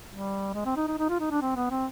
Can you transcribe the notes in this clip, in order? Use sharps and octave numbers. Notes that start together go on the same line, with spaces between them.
G3
G#3
C4
D#4
D#4
D#4
F4
D#4
D4
C4
B3
C4